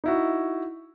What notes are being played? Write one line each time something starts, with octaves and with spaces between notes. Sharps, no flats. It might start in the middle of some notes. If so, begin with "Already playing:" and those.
D#4 E4 F#4